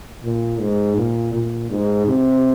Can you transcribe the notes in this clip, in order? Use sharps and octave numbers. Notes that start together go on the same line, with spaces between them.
A#2
G#2
A#2
A#2
G#2
C3